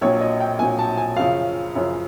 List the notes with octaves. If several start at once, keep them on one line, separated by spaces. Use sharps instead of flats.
A#1 A#2 F#3 C#5
D#5
G5
A#1 A#2 F#3 G#5
A5
G#5
F#2 C#3 F3 F5
F#2 C#3 F3